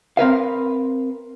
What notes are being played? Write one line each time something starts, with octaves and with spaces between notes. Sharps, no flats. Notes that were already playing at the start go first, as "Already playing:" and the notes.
C4 A#4 B4 F5